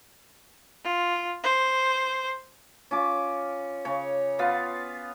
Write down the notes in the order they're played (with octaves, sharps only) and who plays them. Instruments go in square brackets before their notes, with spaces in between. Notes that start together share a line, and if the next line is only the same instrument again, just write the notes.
[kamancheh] F4
C5
[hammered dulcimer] C#4 F4 D6
C#3 C#5
B3 F4 F5